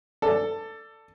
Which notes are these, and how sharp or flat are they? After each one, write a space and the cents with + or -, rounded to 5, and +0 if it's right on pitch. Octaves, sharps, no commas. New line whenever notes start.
A4 +15 D5 +0